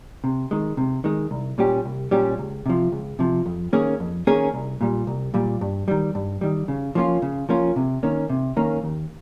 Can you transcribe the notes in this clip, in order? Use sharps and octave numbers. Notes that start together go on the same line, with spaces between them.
C3
D#3 G#3
C3
D#3 G#3
C2
A#2 G3 C#4 G4
C2
A#2 G3 C#4 G4
C#2
C3 F3
C#2
C3 F3
F2
D#3 A#3 C#4 G#4
F2
D#3 A#3 C#4 G#4
C2
A#2 G3
C2
A#2 G3
G2
D#3 G3
G2
D#3 G3
C#3
F3 A#3 C#4 F4
C#3
F3 A#3 C#4 F4
C3
D#3 A#3 C#4
C3
D#3 A#3 C#4
D#2